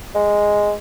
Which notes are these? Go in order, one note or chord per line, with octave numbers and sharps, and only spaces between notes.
G#3